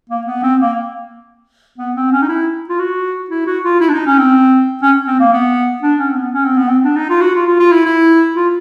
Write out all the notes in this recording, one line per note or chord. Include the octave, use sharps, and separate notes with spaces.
A#3
B3
C4
A#3
B3
C4
C#4
D#4
E4
F4
F#4
E4
F#4
F4
E4
D4
D#4
C#4
C4
C#4
C4
A#3
B3
D4
C#4
C4
B3
C#4
C4
B3
C4
D4
D#4
F4
F#4
F4
F4
F4
E4
E4
F4